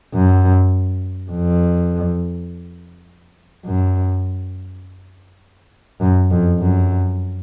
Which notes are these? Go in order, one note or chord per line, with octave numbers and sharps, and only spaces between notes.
F#2
F2
F#2
F#2
F2
F#2